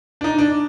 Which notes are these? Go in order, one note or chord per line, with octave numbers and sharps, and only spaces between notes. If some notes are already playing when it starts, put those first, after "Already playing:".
D4
D#4
D4